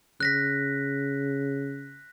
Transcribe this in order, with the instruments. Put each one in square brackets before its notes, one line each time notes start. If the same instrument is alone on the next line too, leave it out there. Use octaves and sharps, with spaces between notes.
[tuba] C#3 [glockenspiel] F#6 A#6 B6